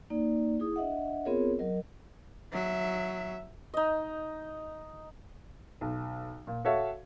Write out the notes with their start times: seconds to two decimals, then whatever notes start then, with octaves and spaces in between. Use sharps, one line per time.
0.10 A#3 D#4 D5
0.60 E4 G#4 D#6
0.76 D4 D#5 E5 F#5
1.25 B3 C4 F4 G#4 A#4 C#5
1.59 F#3 A#4 D#5
2.52 F#3 E5
3.74 D#4 D#5
5.81 B1
6.47 A#2
6.65 F#4 A4 C#5 E5 F5